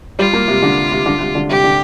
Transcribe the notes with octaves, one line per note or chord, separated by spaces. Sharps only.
G3 F4
A#3
C3
D3
C3
D3
C3
D3
C3 G4
D3